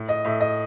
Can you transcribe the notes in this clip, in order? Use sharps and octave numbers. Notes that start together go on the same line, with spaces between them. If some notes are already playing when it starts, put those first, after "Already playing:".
Already playing: A2
D#5
A2 E5
D#5